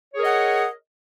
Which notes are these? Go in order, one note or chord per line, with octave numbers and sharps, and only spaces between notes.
G#4 A#4 C#5 D#5 F#5